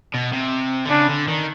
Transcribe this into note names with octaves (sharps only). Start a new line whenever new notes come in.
B2
C3
D3
C#3 D4
D3
D#3